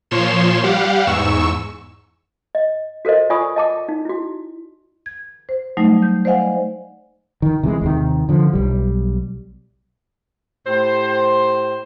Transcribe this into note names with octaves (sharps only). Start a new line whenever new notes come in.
A#2 F3 C#5 C6 E7
G3 G4 F5 F#5
E2 G#2 C#6 E6 E7
D#5
F#4 A4 A#4 C5 D#5
F4 D5 G#5 B5 C#6 D#6
D#5 A5 D6
D#4
E4 F#4
G#6
C5
F#3 G3 A3 D#4
G6
C5 D5 D#5 F5 F#5 G#5
D#3
C3 E3 G3 G#3
D#2 C3 D#3
D3 F3
B1 G3
A2 G4 C5